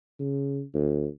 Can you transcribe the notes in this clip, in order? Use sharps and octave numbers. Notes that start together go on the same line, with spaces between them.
C#3
D2